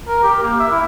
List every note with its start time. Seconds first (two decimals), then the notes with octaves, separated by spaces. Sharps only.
0.08 A#4
0.23 G4
0.43 A#3
0.60 E5
0.72 E4